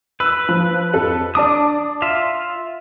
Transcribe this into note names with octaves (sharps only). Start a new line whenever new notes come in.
B4 E6
F3
F2 A4
D4 D5 A5 D6 D#6
F4 E5 F5